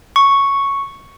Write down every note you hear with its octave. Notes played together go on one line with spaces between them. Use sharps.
C#6